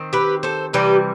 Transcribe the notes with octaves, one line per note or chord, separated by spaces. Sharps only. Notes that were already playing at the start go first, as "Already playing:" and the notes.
Already playing: D#3 C4
G4 B4
A4 C5
C3 E3 G3 G4 B4